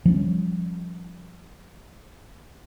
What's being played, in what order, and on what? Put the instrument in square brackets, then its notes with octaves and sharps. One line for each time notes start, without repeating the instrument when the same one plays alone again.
[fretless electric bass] F3 G3 B3 C#4